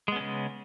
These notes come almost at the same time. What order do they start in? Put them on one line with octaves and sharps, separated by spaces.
G#3 B3 C#4 C#3